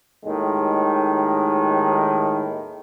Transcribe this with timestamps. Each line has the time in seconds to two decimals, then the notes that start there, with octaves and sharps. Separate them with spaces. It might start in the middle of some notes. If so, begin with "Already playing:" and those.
0.25 D#2 A2 D#3 G#3